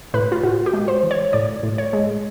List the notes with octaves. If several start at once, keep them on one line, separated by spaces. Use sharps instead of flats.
A2 B4
F4
A2 F#4
G4
G#3
C5
E3
C#5
A2 D5
A2
C#5
G#3